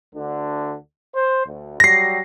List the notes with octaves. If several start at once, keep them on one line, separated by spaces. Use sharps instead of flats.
D2 D3 D4
C5
D2
F#3 G3 A#6 C7